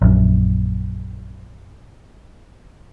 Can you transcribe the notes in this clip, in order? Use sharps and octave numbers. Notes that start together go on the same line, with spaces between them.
A#1 F#2